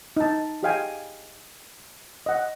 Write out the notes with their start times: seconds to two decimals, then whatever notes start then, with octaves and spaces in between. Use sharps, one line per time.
0.17 D#4 A5
0.63 G4 G#4 D#5 F5 G5 G#5
2.26 D#5 F#5